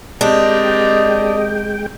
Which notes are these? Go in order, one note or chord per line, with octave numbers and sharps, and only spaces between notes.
G#3 C4 D4 G4 A#4 D#5 G5